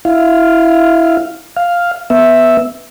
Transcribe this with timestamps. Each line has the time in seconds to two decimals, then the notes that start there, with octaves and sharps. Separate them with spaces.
0.05 E4 F5
1.56 F5
2.10 B3 E5